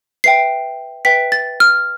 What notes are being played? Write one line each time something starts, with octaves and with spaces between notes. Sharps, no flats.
B4 E5 G5 C7
B4 E5 G5 B6
A6
F6